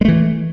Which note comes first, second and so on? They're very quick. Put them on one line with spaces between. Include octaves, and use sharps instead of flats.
G#3 A3 E3